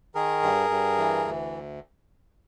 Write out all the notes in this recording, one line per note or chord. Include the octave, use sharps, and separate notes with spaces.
D#3 G#4 A#4
G2
G2
E3
D2